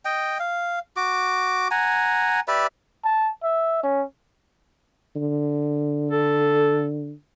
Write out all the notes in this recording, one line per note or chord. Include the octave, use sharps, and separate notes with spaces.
D#5 G5
F5
F#4 D6
F#5 G#5 A#5
G4 B4 D5 E5
A5
E5
C#4
D3
A4